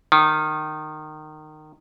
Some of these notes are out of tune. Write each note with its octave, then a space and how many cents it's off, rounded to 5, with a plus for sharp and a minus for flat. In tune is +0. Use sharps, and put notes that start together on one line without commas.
D#3 -20